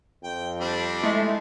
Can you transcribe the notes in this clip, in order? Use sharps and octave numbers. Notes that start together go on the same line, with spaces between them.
F2 G5
G3 C4 D4
G#3 A3 E4